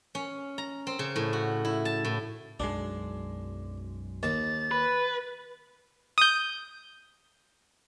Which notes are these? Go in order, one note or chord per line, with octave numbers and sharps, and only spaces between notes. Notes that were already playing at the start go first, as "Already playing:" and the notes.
C#4
A#5
C4
C#3
A2
F#4
E4
A5
A2
B1 F#2 G#3 D4
D#2 A6
B4
D#6 G6